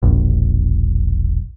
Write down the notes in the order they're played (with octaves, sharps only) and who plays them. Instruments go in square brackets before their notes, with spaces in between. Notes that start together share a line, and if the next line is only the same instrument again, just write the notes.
[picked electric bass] E1 A#1